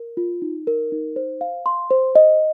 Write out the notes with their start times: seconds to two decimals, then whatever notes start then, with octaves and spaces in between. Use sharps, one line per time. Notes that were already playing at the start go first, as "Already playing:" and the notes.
Already playing: A#4
0.17 F4
0.42 D#4
0.67 A#4
0.92 D#4
1.16 C5
1.41 F5
1.66 C6
1.91 C5
2.16 D#5